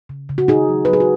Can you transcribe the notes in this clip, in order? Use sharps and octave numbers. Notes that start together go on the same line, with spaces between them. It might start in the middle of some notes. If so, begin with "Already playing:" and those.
C#3
C#3
F#4
C#3 D#4 G#4
F#3
B4
F#3 G#4
F#4